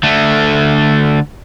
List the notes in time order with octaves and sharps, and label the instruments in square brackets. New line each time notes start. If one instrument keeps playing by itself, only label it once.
[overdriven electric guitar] D3 A3